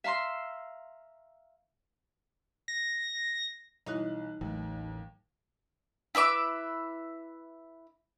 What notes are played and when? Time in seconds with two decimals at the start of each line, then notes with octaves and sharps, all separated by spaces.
0.04 E5 F5 A#5 C6 E6
2.68 A#6
3.86 B1 E3 G3 D#4 E4 C#5 F#6
4.41 A1 D#2 F#3 A3
6.15 E4 B4 E5 D6